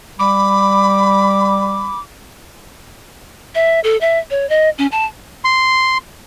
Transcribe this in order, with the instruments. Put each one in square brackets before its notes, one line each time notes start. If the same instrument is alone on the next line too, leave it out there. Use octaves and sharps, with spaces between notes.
[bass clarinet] G3 [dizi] B5 [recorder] D6
[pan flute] E5
A4
E5
C#5
D#5
C#4
A5
[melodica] C6